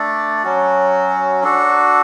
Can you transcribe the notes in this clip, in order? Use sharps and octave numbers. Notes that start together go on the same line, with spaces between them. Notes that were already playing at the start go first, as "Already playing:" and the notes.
Already playing: A3 D4 A4 D5
F#3 C#4 F#4
D4 F#4 A4